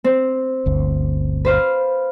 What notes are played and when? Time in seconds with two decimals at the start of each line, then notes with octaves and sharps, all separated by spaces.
0.04 C4
0.66 G1 D2
1.45 B4 C5 F5